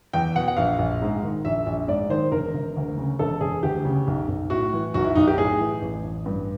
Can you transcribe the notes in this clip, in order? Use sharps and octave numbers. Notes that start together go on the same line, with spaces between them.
E2 G5
B2 F#5
F#5
A#1 F5
A#1
G#2
D#3
A#1 E5
A#1
G#2 D5
D#3 C5
E1 A#4
E1
D2
C#3
E1 A4
E1 G#4
D2 G4
C#3
B1
B1
A2 F#4
E3
B1 F#4
E4
B1 D#4
G4
A2 G#4
E3
A1
A1
G2